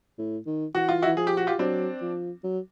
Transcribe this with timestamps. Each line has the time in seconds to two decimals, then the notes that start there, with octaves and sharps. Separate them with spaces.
0.18 A2
0.46 D#3
0.74 E3 F#4
0.89 F4
1.02 E4 F#4
1.07 E3
1.17 F3 G#4
1.27 G4
1.37 F#4
1.47 F4 G4
1.58 F#3 C4 D4
2.01 F3
2.44 F#3